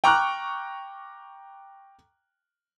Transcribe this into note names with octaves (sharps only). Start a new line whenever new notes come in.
G5 A#5 C#6 D6 F6 F#6